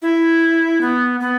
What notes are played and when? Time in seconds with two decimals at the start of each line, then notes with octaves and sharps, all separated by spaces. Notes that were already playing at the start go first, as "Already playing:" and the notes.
0.02 E4
0.81 B3
1.20 B3